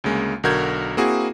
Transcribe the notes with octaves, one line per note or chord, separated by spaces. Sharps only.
D2 C#3 G#3 A#3
B1 D3 F#4 A#4 G6 G#6
A#3 C4 E4 F#4 G#4